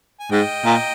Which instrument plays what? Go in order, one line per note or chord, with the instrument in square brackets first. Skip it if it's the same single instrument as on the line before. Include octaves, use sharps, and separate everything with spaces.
[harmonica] G#5
[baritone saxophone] G#2 [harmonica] D#5 G5
[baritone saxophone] A#2